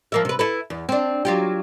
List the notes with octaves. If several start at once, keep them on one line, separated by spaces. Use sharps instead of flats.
F3 A#3 E5
C3 B4
E4 A4 B4
E2
C4 D4
F#3 F4 G4